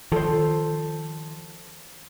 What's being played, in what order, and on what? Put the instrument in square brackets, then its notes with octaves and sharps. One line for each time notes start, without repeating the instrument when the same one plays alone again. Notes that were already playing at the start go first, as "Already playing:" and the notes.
[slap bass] D#3 F3 [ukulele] A4 C5